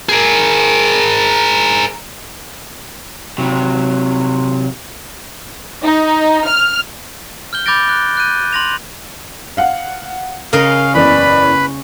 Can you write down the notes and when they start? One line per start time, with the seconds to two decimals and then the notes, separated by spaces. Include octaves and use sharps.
0.09 G#4 A#4
3.38 C3 F#3
5.83 D#4
6.47 F6
7.53 F6 G6 G7
7.66 B5 D6 G6 A6 A#6 D7
7.89 F#6
8.17 F#6 G6 D#7
8.53 C6 A#6 F7
9.57 F5 F#5
10.53 C#3 C#4 A#4 D#5 F5
10.94 F#1 E2 B4 D5 B5